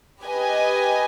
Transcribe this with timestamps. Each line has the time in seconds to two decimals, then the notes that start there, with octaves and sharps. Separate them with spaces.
0.22 G4 B4 D#5 G#5